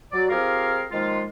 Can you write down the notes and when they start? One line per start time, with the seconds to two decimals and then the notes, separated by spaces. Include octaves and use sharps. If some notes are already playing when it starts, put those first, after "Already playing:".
0.12 F#3 D5
0.30 C4 F4 G4 G#4 A#4 F5
0.91 D#3 F3 G#3 A#3 F4